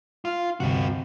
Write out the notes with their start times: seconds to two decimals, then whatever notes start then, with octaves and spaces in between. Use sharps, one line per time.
0.25 F4
0.60 D2 G2 C3 C4 F#4